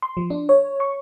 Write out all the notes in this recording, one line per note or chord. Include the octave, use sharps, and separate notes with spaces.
C6
F3
D4
C#5
C#6